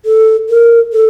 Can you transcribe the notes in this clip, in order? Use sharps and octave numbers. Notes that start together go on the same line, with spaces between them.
A4
A#4
A4